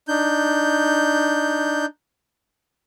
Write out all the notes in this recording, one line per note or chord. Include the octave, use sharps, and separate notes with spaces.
D4 D#4 G6